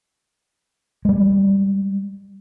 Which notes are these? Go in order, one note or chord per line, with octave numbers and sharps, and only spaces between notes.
G3 G#3